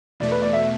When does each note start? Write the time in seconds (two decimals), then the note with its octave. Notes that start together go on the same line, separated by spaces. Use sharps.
0.20 E2 B2 A3 D5
0.32 B4
0.42 D5
0.53 E5